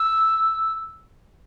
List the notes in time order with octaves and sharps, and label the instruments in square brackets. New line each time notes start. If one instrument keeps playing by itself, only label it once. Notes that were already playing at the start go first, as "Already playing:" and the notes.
Already playing: [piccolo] E6